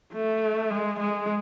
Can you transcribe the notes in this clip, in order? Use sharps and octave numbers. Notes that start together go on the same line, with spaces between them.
A3
G#3
G#3